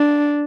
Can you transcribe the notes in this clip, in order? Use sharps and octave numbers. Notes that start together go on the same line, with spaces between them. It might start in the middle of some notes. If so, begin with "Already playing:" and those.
Already playing: D4